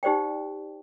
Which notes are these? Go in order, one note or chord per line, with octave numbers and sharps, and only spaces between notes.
D#4 G4 C5 D5 G5